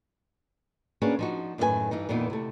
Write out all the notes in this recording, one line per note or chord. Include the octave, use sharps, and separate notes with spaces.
A#3 C#4 D4 F#4 G#4 B4
F3 D#4 F#4
F#2 A2 D#3 F4 B4 G#5
G2 E3 D#4
F2 A#2 D#3 E3 B3 D#4
C3 A3